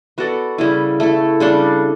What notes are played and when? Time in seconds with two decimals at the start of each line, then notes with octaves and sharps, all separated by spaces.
0.18 B3 F#4 A4 D5
0.58 C#3 G3 C#4 E4
1.00 A3 E4 A4
1.40 C#3 G3 D4 A4